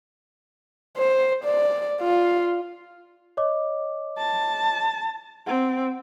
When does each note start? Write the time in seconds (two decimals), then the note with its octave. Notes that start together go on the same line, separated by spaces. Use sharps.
0.98 C5
1.44 D5
2.01 F4
3.37 C#5 D#5 D6
4.18 A5
5.47 C4 F#5